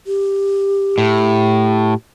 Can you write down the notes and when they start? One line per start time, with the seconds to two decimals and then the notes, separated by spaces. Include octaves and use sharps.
0.06 G4
0.98 A2